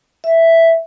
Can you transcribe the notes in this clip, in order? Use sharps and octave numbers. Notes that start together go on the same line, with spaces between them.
E5